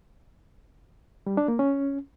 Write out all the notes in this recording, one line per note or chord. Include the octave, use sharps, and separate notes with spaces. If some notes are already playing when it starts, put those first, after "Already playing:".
G3
D4
A#3
C#4